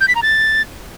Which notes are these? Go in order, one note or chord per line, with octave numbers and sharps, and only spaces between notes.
G6
B6
A#5
A6